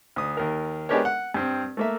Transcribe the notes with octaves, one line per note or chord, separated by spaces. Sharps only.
D2 D#6
D#2 A#4
G#3 B3 D4 G4 A#4 C#5
F#5
G2 C4
A3 A#3 E5